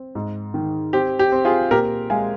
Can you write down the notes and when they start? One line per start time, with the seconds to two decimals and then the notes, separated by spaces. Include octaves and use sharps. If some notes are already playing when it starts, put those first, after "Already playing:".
Already playing: C4
0.15 G#2
0.54 D#3
0.93 C4 G4
1.19 G4
1.32 C4
1.45 F4 G#4
1.71 A#2 G4 A#4
2.10 G#3 F5 G#5